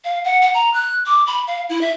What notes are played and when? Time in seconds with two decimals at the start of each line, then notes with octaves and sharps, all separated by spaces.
0.05 F5
0.24 F#5
0.42 F#5
0.54 A#5
0.73 F#6
1.06 D6
1.27 B5
1.47 F5
1.69 E4
1.81 E5